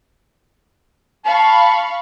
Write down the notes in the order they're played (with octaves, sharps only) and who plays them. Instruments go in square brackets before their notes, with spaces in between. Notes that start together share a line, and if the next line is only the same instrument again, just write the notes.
[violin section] F5 B5 C#6 [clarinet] A5